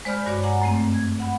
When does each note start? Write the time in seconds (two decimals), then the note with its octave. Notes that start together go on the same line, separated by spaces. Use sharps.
0.05 G#3 C5 D5 B5 F6 G6
0.26 G2 F#4 C#5 D5 D6
0.43 F#5 G#5 A#5 D6
0.61 F#2 A3 C4
0.94 G#6
1.20 F#5 B5